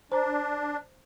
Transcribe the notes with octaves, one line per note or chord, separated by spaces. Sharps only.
D4 C5 A#5